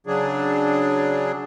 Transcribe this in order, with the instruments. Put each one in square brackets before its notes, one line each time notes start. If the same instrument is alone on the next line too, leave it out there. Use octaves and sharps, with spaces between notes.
[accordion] C#3 F#3 D4 G#4